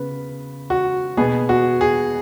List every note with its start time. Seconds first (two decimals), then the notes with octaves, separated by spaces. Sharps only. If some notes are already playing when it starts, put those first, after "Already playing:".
Already playing: C#3 B3 B4
0.70 F#4
1.17 B2 B3 G#4
1.49 F#4
1.81 G#4